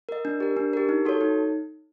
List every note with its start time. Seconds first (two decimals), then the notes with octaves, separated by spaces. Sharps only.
0.09 A#4 D#5
0.25 D4
0.40 G4 A#4
0.57 D4
0.73 G4 A#4
0.89 D#4
1.05 F#4 A4 C#5
1.21 D#4